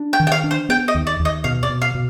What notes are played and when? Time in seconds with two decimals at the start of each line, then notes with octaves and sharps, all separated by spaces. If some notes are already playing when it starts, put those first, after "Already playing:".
Already playing: D4
0.13 G5
0.20 D#3
0.27 G5
0.32 F5
0.44 D4
0.51 C5
0.69 B3 G5
0.88 D#5
0.95 D#2
1.07 D5
1.20 D#2
1.25 D#5
1.44 B2 F5
1.63 D5
1.69 B2
1.82 F5
1.95 B2